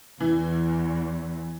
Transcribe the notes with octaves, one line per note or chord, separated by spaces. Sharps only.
E2 E3